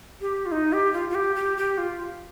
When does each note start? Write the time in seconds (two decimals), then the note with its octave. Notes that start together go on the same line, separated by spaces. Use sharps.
0.21 G4
0.46 F4
0.52 D#4
0.73 G4
0.93 F4
1.10 F4
1.15 G4
1.36 G4
1.57 G4
1.78 F4